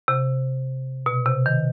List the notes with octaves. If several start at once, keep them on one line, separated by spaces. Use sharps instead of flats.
C3
B2
C3
D#3